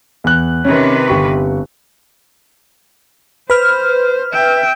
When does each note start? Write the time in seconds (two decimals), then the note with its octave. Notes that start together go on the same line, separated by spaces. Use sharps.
0.24 E2 F#6
0.65 C3 D#3 C#4 B4
1.08 G1 G4 C#6
3.50 B4 C5 F6
4.33 E5 G5